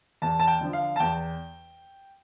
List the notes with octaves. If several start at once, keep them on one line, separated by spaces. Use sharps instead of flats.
E2 A5
A5
G5
D3 F3
F5
A5
E2 G5